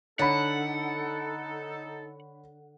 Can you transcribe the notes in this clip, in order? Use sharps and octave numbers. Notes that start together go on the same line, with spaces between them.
D3 D#4 A4 C#5 F#5 B5